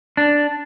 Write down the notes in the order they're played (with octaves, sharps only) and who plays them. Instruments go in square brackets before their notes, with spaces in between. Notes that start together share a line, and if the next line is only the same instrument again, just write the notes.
[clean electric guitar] D4